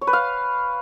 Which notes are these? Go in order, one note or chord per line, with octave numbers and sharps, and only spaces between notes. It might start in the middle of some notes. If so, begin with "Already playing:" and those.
C#5
B4
F5